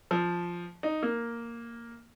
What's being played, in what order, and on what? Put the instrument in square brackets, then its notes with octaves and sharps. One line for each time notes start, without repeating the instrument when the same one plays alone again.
[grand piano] F3
D#4
A#3